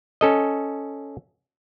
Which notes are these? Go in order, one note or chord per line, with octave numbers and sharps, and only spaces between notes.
C#4 A4 D#5